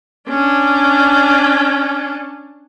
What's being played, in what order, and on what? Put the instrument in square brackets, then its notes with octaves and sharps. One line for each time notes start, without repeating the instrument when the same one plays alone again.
[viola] C#4 D4